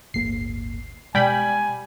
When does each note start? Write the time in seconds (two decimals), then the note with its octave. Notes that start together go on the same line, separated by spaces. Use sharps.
0.14 D1 G1 A#3 C7
1.15 B2 G3 G#3 G5 G#5 B5